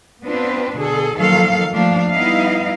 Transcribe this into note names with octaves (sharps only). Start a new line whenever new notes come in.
B3 C4 D4 F4 B4
B2 D3 G#4 A4
D#3 F3 F#3 A#3 A4 F5
F3 A3 A#3 D4 F5
G3 B3 D#4 E4 D#5 F5